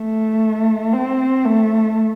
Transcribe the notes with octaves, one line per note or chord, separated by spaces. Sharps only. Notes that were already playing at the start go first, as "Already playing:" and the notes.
Already playing: A3
C4
A3